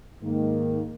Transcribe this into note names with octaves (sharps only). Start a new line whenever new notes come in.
G#2 D#3 A#3